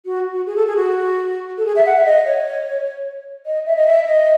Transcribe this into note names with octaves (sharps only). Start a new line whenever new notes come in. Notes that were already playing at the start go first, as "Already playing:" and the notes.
F#4
F#4
G#4
A4
G#4
F#4
A4
G#4
E5
F#5
E5
D#5
C#5
D#5
E5
D#5
E5
D#5